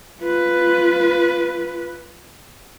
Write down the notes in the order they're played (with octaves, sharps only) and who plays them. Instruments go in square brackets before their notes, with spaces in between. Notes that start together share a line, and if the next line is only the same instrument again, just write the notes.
[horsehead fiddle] F4 B4